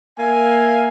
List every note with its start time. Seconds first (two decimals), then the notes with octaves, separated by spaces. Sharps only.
0.18 A#3 E5 F5 G#5